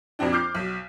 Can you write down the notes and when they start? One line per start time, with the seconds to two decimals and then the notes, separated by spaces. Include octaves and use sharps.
0.19 F2 A#2 F3 C4 D4
0.32 D6 F6 G6 C7
0.55 B1